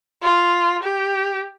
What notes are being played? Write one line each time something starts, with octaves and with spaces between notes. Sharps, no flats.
F4
G4